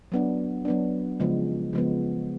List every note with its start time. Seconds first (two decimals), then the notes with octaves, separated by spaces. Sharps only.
0.12 F#3 B3 D4
0.65 F#3 B3 D4
1.20 C#3 F3 G#3 B3
1.73 C#3 F3 G#3 B3